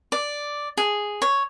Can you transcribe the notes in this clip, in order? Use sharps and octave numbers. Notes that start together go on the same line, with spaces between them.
D5
G#4
C#5